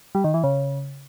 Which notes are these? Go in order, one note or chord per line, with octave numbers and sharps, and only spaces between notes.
G3
D#3
E3
C#3